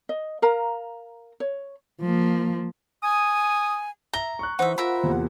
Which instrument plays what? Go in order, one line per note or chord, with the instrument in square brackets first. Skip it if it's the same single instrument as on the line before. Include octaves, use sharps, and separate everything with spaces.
[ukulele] D#5
A#4 F5 A#5
C#5
[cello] F3 A#3
[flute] G#5 [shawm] D#6
[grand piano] E5 G7 [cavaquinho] A#5
[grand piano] C#6 F#6
[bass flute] E3 [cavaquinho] D#4 E5 [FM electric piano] C5 F#5
[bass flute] F4 [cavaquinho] A#4 E5 B5
[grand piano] E2 C3 A#3